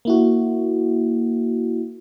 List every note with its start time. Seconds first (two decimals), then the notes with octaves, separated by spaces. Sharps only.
0.05 A#3 E4 F#4